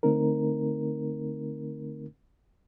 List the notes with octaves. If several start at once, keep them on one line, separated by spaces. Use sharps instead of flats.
D3 A3 C4 D#4 A#4